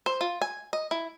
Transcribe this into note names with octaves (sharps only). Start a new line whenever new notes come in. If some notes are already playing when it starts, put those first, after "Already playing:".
C5
F4
G#5
D#5
E4